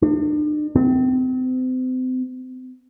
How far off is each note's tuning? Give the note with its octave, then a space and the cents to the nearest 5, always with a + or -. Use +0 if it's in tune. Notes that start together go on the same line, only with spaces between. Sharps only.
D4 +40
C4 -35